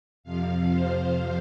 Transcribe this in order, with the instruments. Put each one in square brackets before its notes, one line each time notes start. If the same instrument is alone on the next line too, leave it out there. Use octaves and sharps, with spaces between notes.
[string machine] F2 C3 F3 F5
C5